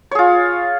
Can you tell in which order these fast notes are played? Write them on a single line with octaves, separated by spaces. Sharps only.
C#5 G#4 F4